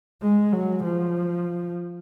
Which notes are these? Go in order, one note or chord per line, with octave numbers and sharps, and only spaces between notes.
G#3
F#3
F3